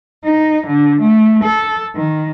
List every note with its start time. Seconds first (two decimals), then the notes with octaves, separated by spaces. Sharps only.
0.24 D#4
0.66 D3
1.01 A3
1.44 A4
1.95 D#3